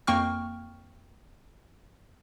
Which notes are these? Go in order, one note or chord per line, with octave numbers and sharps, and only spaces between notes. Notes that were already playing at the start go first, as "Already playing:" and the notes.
F2 A#3 G5 C#6 F6